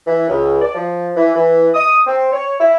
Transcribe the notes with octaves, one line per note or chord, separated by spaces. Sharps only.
E3
C#2
D5
F3
E3
E3
D#6
C4
C#5
E4